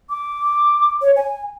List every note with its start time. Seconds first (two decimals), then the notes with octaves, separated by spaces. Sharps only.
0.10 D6
1.02 C#5
1.16 G#5